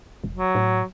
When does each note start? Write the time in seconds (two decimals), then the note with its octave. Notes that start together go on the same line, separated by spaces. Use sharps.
0.24 F1
0.37 F#3
0.55 A2